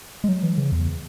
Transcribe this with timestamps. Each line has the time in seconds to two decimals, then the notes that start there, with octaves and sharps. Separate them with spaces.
0.24 G#3
0.29 F#3
0.43 E3
0.58 C#3
0.72 E2